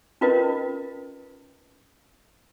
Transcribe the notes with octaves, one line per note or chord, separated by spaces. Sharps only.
C#4 D#4 F4 A#4 B4 D#5